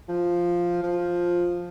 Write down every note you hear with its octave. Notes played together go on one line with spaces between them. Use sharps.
F3
F3